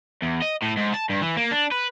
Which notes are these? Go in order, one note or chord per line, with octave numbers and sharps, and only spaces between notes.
E2
D#5
A2
G#2
A5
G2
E3
A#3
D4
B4